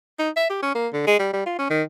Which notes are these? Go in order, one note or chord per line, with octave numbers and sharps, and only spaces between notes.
D#4
E5
G4
C#4
A#3
D3
G#3
G3
G3
F4
C#4
D#3